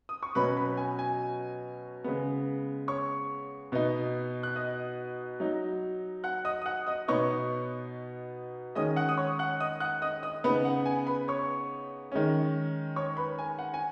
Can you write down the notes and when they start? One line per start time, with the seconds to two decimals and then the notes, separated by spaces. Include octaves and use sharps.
0.09 D#6
0.23 C#6
0.35 B2 F#3 C#4 B4 B5
0.57 B4 B5
0.77 G#5
0.99 G#5
2.04 C#3 G#3 B3
2.88 C#5 C#6
3.72 B2 B3 D#4
4.43 F#6
4.56 D#5 D#6
5.40 F#3 D#4
6.24 F#5 F#6
6.45 D#5 D#6
6.62 D#6
6.66 F#5 F#6
6.87 D#5 D#6
7.08 B2 B3 D#4 C#5 C#6
8.75 D#3 G#3 C#4 D#5 D#6
8.96 F#5 F#6
9.09 D#6
9.17 C#5 C#6
9.39 F#5 F#6
9.60 D#5 D#6
9.80 F#5 F#6
10.02 D#5 D#6
10.23 D#5 D#6
10.44 C#3 B3 D#4 B4 B5
10.65 F#5
10.86 G#5
11.07 B4 B5
11.28 C#5 C#6
12.12 D#3 G#3 C#4
12.96 C#5 C#6
13.17 B4 B5
13.39 G#5
13.59 F#5
13.74 G#5